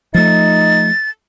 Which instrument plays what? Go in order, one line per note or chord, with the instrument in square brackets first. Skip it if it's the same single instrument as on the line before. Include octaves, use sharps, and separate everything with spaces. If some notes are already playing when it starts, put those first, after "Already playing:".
[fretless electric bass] F3 A3 [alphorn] D#4 [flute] A6